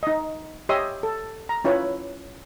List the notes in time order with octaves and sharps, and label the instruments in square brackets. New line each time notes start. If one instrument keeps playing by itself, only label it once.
[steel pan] D#4 D#5
G4 C#5 D#5 E5 C6 D#6
A4
A#5
C#4 E4 F4 B4 C#5